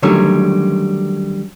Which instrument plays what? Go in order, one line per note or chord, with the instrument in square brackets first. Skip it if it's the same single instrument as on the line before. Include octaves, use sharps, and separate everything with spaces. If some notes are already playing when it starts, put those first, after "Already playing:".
[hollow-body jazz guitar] D3 D#3 F#3 G3 A3 C#4